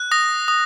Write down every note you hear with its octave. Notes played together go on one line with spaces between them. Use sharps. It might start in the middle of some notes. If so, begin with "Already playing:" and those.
Already playing: F#6
D#6 A#6
D#6